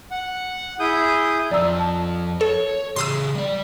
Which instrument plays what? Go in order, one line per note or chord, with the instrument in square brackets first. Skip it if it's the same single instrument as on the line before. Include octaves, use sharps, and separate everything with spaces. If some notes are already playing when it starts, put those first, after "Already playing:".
[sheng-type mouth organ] F#5
E4 G#4 D#6 G6
[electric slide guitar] F2 F3 [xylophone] D5 A#5 E6
[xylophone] A5
[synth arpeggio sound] A4 [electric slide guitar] C#5
[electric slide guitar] C#3 G4 G#4 [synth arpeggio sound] C6 D#6 E6
[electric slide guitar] G3 D5